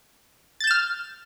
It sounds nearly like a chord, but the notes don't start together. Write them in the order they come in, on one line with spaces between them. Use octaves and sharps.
A6 G6 E7 F6